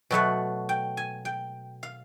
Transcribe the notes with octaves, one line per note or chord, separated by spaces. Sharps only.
B2 F#3 A3 F#5
G5
G#5
G5
F5